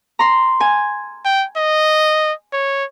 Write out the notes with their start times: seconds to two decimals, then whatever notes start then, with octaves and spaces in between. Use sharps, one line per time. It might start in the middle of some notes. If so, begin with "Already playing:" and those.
0.19 A#5 C6
0.60 G#5
1.25 G5
1.57 D#5
2.53 C#5